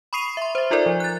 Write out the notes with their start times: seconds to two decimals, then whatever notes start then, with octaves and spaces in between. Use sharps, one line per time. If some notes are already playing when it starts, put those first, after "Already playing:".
0.13 B5 C#6 D#6 C7 D#7 F7
0.37 E5 C6
0.55 C5 E5
0.71 D#4 F4 A4 A#4 D5
0.86 F3
1.00 F#6 A6